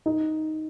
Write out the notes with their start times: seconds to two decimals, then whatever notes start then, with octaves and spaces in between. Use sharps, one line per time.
0.06 D#4